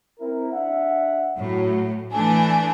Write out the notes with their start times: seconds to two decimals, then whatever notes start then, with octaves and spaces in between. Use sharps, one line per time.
0.19 C4 E4 A#4
0.53 D4 E5 F#5
1.38 A2 F#3
2.12 E3 A3 D4 G#5